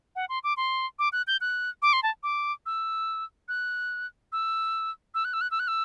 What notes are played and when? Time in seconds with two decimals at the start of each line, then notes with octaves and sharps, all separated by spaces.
0.16 F#5
0.29 C6
0.44 D6
0.57 C6
0.99 D6
1.12 F#6
1.27 G6
1.41 F#6
1.82 D6
1.93 C6
2.03 A5
2.23 D6
2.66 E6
3.48 F#6
4.32 E6
5.14 E6
5.25 F#6
5.33 E6
5.41 F#6
5.51 E6
5.59 F#6
5.68 E6